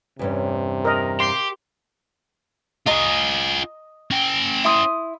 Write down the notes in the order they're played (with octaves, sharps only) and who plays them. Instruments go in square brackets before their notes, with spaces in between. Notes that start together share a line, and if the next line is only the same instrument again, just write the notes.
[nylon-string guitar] E2 G2 C#4 [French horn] C3
[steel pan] A#4 D#5
[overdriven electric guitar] G4 [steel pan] C6
[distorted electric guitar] F4 G#4 [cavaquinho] D#5 A#5 D#6
[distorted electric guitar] C#4 G5
[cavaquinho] E4 C6 D#6